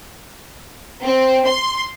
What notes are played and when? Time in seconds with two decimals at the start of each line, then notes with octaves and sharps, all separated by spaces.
1.03 C4
1.47 C6